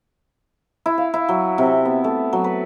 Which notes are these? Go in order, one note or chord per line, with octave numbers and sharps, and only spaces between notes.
E4
F5
E4
F#3
C3
B3
A3
F#3
B4